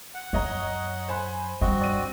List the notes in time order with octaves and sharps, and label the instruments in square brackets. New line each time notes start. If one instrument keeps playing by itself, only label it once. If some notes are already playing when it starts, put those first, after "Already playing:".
[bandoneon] F#5
[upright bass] F#2 [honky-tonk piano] C#5 D#5 A#5
[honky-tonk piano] C5 G#5 B5
[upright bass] G2 [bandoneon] C4 F#4 [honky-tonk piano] D#5
[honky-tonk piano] D5 D#7